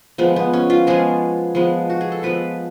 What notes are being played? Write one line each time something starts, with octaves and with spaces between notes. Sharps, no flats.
F3 G#3 B3
B3
C#4
F4
F3 G#3 B3 G#4
F3 G#3 B3
F#4
G#4
A4
F3 G#3 B3 B4